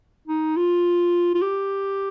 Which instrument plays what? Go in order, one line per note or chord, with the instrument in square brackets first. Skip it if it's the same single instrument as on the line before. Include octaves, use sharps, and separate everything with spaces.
[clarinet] D#4
F4
F4
G4